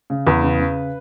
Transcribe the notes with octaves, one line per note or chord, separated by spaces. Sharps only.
C#3
E2 B4
C#3
C#3